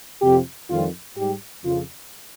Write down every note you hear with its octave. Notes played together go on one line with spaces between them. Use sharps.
F2 C3 F3 G4
F2 D#3 G3 F4
G#2 G3 G4
F2 C#3 F3 F4